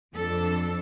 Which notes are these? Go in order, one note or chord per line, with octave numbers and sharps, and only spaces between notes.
F2 D4 A4